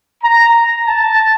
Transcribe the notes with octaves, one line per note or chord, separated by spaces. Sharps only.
A#5
A5